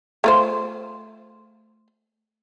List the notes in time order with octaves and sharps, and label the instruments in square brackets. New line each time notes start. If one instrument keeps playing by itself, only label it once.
[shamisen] A3 F4 C5